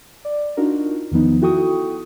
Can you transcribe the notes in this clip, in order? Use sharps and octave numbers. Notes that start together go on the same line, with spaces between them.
D5
D4 D#4 F4 F#4 A#4
E2 D#3 F3 B3 D#4
E4 F#4 A4 G5 C#6 D#6